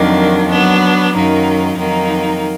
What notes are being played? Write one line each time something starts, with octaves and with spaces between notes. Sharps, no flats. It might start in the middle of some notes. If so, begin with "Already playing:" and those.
Already playing: F2 D#3 F#3 A#3 D4
F#3 B3 D4
F#2 D#3 F#3 A#3 D#4
F2 D#3 F#3 A#3 D#4